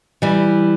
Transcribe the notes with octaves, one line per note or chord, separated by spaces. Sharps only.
E3 G3